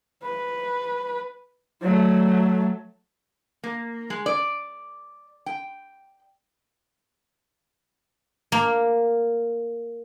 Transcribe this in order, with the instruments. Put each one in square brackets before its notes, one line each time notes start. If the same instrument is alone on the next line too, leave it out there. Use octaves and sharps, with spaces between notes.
[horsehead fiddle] B4
F#3 A3
[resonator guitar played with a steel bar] A#3
G#3
D5
G5
[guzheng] A#3